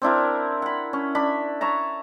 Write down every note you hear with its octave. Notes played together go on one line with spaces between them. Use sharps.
C4 D4 E4 A#4
F#5 B5
C#4
D4 B5
C#5 E5 A5 A#5